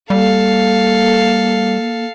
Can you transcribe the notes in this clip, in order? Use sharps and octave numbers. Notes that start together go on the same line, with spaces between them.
G3 A#3 A4 F5